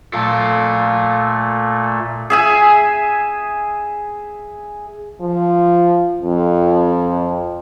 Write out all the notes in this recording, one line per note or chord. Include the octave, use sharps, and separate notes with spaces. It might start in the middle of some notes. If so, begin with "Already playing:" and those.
A#2 A3 A4 F5
G#4 E5 G#5
F3
F2